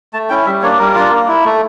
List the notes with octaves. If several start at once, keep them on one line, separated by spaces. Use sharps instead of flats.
A3 A5
C#4 E4 G5
G3 E5
A#3 D4 C#5
G3 A#4
D4 F4
A#3
E4
A3